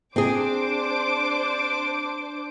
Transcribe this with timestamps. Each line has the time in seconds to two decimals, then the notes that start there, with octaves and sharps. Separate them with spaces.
0.16 C4 D4 G#4 C5 D6